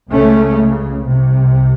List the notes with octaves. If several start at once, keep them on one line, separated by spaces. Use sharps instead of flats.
C#2 C#3 A3 C#4
C2 C3